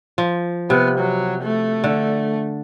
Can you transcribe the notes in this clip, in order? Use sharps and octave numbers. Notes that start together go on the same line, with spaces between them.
F3
C3 B3
F#3
A3
D3